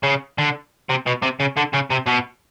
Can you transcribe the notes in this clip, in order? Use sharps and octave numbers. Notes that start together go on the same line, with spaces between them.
C#3
D3
C3
B2
C3
C#3
D3
C#3
C3
B2